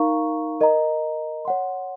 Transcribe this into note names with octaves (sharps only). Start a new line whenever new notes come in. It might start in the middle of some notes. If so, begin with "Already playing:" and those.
Already playing: D#4 A#4 F5 A#5 C#6
A#4 D#5 A#5
C#5 F#5 C6